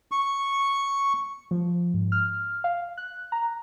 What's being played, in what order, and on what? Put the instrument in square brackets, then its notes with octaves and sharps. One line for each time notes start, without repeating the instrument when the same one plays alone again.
[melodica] C#6
[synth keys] F3
G#2
F6
F5
F#6
A#5